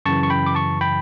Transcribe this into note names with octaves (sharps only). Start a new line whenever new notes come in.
F#2 C#3 E3 A5 C#6
C#6
G5 B5
D6
A5 C#6
G5 B5